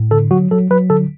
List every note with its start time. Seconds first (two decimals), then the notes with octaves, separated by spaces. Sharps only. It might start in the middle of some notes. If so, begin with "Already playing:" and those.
Already playing: A2
0.11 D3 A4
0.31 F#3 F#4
0.51 F#3 A4
0.70 F#3 B4
0.90 D3 A4